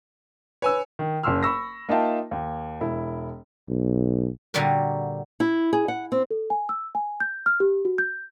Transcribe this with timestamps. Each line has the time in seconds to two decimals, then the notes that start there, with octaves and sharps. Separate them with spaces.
0.62 B4 C#5 G#5 E6
0.99 D#3
1.23 F#1 C#4 C6 E6 F6
1.43 B5 C#6 E6 A#6
1.89 A#3 D#4 F4 E5 G5 A5
2.31 D#2
2.81 E1 E4
3.69 B1
4.54 A#2 D3 G3 F#4 A#4
5.40 E4
5.73 G#4
5.88 F#5
6.12 C4
6.31 A4
6.50 G#5
6.69 E6
6.95 G#5
7.20 G6
7.46 F6
7.60 G4
7.85 F#4
7.98 G6